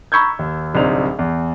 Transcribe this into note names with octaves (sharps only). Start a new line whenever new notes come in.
A#5 B5 C#6 E6 G6 G#6
D#2
D1 C2 D#4 C5 F7
E2